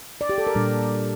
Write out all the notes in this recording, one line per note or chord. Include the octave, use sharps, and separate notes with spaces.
D5
G4
A4
A#4
A#2 G3 D4